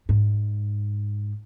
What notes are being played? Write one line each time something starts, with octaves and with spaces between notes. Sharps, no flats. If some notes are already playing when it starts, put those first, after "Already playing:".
G#2